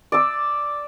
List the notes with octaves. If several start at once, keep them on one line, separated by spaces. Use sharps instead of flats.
D5 E6